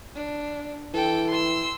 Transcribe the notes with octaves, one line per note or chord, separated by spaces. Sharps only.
D4
E3 A4 G5
C6 E6